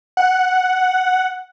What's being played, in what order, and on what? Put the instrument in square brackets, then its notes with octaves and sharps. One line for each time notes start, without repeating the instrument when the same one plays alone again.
[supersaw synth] F#5